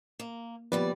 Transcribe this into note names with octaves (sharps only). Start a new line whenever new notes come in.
A#3
D#2 F3 G3 B3 B4 D5